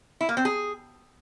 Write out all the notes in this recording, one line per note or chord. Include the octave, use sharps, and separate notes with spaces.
E4
A#3
C4
G#4